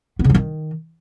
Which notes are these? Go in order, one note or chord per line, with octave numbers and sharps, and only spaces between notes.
B3
C#3
F#3
D#3